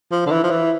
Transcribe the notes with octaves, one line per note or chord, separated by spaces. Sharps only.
F3
D3
E3
F3
E3